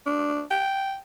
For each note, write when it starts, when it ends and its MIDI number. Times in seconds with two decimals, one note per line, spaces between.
0.06 0.42 62
0.51 0.97 79